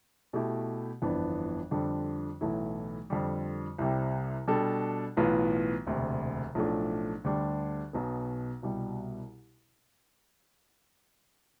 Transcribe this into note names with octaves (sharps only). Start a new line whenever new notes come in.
B2 A3 E4 G4
G1 F2 E3 B3 D4
F2 D3 G3 D4
B1 A2 E3 A3 E4
F2 D3 G3
C2 C3 G3
B2 G3 D4 A4
B1 A2 E3 B3 F4
E1 D2 C3
B1 A2 F3 A3 D4
D2 D3 G3 D4 G4
B1 B2 B3
C2 B2 G3